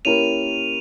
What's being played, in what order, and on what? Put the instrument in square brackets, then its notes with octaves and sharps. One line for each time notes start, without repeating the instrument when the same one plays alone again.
[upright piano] A#3 C#4 E4 G4 A#4 [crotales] D#7 F7